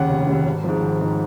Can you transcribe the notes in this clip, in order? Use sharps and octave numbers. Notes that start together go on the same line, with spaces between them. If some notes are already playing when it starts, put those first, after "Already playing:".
Already playing: D#2 C#3 F#5
F1
D#2 C#3
G#1
G#2 F3
G#1
G#2 F3